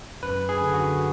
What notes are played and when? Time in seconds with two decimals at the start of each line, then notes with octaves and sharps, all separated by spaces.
0.23 F#2 B4
0.49 G#4
0.61 D3
0.74 F#4